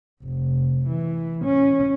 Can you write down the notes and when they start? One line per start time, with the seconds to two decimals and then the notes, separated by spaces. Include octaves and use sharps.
0.24 F1
0.87 E3
1.45 C#4